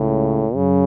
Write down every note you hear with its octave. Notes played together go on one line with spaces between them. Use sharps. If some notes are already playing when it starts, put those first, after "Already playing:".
Already playing: C#2 A2 C#3
F#2 C#3 F#3